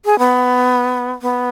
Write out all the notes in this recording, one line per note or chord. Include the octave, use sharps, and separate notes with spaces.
G#4
B3
B3